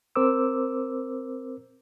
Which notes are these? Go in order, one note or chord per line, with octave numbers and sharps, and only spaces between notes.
C4 A#4 C5 D6 E6